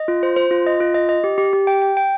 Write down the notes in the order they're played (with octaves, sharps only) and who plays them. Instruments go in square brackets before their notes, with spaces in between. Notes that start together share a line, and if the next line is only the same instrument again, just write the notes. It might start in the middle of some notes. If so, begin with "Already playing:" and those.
Already playing: [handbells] D#5
F4
C5
C5
F4
D#5
F4
D#5
D#5
G4
G4
G4
G5
G5
G5